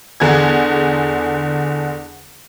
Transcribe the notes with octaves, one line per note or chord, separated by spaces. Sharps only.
E2 D3 G#4 G#6